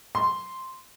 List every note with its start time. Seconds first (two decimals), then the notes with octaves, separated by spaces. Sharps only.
0.15 C6